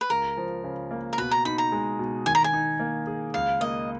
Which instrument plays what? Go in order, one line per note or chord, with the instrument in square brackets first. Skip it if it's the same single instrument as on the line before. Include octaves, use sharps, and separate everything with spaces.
[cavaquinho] B4
[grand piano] C#2 [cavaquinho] A#4
[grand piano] F3
C#3
A#3
[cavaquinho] A#4
[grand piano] B2 [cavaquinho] B4
[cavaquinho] A#5
[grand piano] D#4 [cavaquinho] B5
[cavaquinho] A#5
[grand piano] G#3
B2
[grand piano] D#3 [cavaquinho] G#5
[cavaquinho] A#5
G#5
[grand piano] D#4
A#3
G#4
[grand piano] C#2 [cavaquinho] F5
[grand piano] A#3 [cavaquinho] D#5